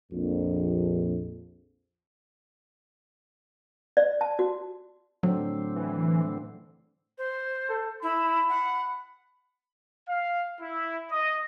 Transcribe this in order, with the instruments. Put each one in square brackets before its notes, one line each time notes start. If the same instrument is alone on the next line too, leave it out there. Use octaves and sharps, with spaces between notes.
[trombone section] A#1 F2
[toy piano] D5
A5
F#4
[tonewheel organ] A2 D3 C4 [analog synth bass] F#3
[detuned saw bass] E3
[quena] C5
[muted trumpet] A4
[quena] E4 [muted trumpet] B5
[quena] F#5
[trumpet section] F5
E4
D#5